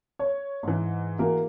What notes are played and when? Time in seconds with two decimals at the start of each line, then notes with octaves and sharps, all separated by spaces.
0.19 C#5
0.63 G#2 E3
1.19 E3 A#3 F#4 G#4 A#4